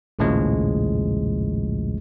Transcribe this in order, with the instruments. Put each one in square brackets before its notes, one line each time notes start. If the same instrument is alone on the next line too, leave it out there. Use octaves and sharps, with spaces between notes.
[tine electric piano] A#1 D#2 A2 C#3 F3 G#3